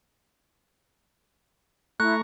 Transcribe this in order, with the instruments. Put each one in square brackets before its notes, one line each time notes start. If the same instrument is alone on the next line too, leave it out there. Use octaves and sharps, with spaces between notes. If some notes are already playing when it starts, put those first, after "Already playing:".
[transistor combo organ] A3 A#5 C#6 [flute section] E4 [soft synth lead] F#6